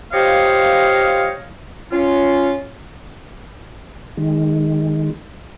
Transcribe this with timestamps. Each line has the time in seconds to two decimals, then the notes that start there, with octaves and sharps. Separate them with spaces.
0.13 F4 G4 C5 C#5 D#5 F5
1.92 C#4 F4
4.17 D#3 G#3